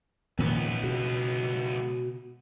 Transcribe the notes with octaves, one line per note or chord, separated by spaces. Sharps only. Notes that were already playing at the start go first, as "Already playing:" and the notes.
C#2 A#2 D#3 F3 B3
B2